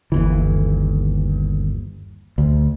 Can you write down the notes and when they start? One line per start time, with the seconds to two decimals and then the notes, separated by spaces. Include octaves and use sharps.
0.12 G1 D#2 E3
2.38 D2